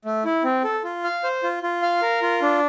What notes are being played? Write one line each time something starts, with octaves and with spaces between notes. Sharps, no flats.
A3
E4
C4
A4
F4
F5
C5
F4
F4
F5
A#4
F4
D4